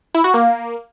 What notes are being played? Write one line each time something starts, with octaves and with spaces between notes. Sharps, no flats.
E4
F#4
A#3